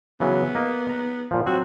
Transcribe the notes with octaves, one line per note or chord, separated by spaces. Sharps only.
C#3 E3 F#3 B3
A#3 D#5
A#5
A#2 F3
F#3 C4 F#4